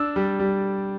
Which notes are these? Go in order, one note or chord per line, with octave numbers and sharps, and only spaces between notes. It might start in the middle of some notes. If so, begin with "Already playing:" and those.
Already playing: D4 E6
G3
G3